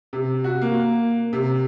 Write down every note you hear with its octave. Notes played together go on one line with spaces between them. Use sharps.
C3
F#4
A#3
C3